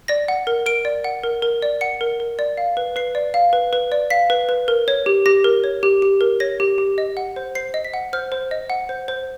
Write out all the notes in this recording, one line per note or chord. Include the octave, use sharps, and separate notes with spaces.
D5 A#6
F#5
A#4
A#4 D7
D5
F#5
A#4
A#4
D5
F#5 C#7
A#4
A#4
D5
F5
B4
B4 C7
D5
F5
B4
B4
D5
F5 B6
B4
B4
A#4
C#5
G4
G4 A#6
A#4
C#5
G4
G4
A#4
C#5 A#6
G4
G4
D#5
F#5
C5
C5 C7
D#5
B6
F#5
C5 F6
C5
D#5
F#5
C5
C5